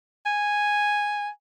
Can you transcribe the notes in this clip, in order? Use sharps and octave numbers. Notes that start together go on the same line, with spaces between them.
G#5